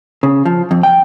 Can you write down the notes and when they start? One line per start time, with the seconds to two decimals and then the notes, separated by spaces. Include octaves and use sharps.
0.23 C#3
0.45 F3
0.71 F2
0.83 G5